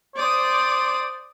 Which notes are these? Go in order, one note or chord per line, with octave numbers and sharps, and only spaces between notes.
C5 D5 D6 D#6